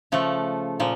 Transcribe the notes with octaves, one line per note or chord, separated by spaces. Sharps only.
C#3 F3 A3
A#2 F3